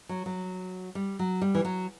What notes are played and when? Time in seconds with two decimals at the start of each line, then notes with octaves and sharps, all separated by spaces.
0.09 F#3
0.26 F#3
0.95 G3
1.19 F#3
1.41 G3
1.55 E3
1.65 F#3